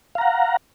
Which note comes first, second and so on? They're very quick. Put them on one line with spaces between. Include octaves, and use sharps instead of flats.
F5 A#5 F#5